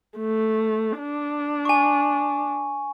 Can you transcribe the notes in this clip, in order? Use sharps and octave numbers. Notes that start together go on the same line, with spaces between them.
A3
D4
G#5 C#6